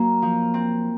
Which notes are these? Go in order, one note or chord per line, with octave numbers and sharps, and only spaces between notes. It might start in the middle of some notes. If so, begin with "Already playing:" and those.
Already playing: F#3 A#3
F3
C4